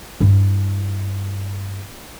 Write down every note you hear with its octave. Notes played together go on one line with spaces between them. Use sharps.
G2 E4